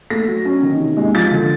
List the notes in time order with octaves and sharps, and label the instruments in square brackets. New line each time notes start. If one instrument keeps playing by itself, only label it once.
[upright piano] A3 A#6
F#3
C#4
D#3
C3
G#3
F3 A6
D3